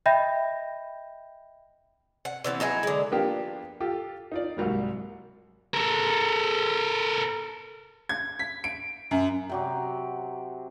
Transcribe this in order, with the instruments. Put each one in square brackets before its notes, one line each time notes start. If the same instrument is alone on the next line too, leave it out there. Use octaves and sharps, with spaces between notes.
[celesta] D#5 E5 G5 B5 G6 A#6
[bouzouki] F#5
D3 E3 B3 C4
F#3 D#4 E4 G#4
D3 G#3
[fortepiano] F3 A#3 B3 D4 F4 G4
F4 G4 A4
D#4 F4 D5
C2 G#2 F#3 G3 A#3
[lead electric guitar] A4 A#4
[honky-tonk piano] G#6
B6
D7
F#2
[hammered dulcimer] C3 F#3 G4